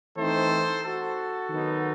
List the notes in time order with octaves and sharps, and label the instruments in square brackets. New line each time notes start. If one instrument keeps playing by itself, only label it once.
[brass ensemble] E3 A3 C4 D#4 A4 C5
F#4 A4
D#3 F#3 B3 D#4